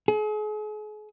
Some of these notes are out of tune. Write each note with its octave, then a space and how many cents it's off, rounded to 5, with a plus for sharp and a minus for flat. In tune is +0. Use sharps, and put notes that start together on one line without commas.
G#4 +40